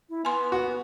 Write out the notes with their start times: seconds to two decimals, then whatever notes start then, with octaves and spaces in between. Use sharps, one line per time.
0.10 E4
0.25 B3 G#5 C6
0.52 F#4